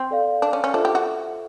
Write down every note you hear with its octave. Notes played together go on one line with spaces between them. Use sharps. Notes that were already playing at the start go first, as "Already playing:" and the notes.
Already playing: C4
A4 D5 F5
D4
C#4
C#4
D4 F4 A4 C5 E5
G4
F#4